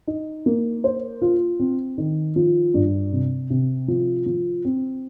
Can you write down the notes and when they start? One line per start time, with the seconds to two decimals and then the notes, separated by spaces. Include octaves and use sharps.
0.07 D#4
0.46 A#3
0.84 C5
1.22 F4
1.60 C4
1.98 D#3
2.36 F3
2.74 G2
3.12 C3
3.50 C3
3.88 F3
4.26 F3
4.65 C4